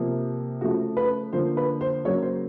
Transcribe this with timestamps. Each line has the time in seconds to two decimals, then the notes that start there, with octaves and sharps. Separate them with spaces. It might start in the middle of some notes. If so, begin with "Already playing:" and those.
Already playing: C3 F3 A#3
0.61 C#3 F3 A3 F#4
0.97 B4
1.33 D3 F3 A#3 C5
1.57 B4
1.81 C5
2.04 C#3 F#3 A#3 C#5
2.22 C5